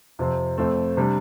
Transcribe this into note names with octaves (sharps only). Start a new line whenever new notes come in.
F2 C3 F3 C4
F2 F3 A3 C4
C3 G3 D4